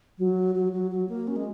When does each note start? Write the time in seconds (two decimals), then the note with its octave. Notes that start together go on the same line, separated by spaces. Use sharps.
0.19 F#3
0.55 F#3
0.73 F#3
0.91 F#3
1.09 A#3
1.28 C#4
1.36 G#3